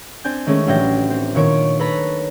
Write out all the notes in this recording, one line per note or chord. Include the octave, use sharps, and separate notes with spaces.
C4 D4 G#5 G6
D#3 G#3 A3 C#4
A1 A2 F#3 D4 G5 A#6
C4
A#2 D#3 C#5 D7
A4 B4 C#5 A#5 B5